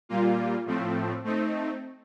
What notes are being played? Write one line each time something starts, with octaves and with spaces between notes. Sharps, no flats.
A#2 G3 A#3 F4
A2 F3 A3 C4
A3 C4 D#4